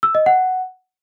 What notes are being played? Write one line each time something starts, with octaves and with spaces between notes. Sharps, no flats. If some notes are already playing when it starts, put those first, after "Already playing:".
E6
D#5
F#5